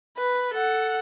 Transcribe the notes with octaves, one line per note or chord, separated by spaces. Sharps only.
B4
A4 F#5